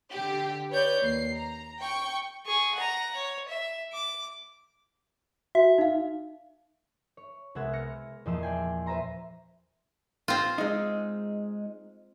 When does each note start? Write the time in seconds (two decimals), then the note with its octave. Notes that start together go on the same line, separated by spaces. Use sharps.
0.11 D3 G4
0.70 B4 C#5 D5 G6
1.02 D#2 C7
1.34 A#5
1.80 G5 C#6
2.46 G#4 C#6
2.75 F#5 A#5
3.15 C#5
3.48 E5
3.92 D6
5.55 F#4 E5
5.78 D#4 F5
7.17 C#5
7.55 C2 G#3 B3 F#5 E6 G#6
7.73 F6 A#6 C#7
8.26 E2 A#2 F3 D#5 C6 E6
8.43 D5 G5 G#5
8.86 B4 C5 E5 A#5 C6
10.28 C4 F4
10.58 G#3 D#4